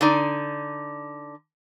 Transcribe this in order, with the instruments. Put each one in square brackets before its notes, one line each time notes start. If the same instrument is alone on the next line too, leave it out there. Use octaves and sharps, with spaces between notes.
[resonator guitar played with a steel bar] D3 D#4 D5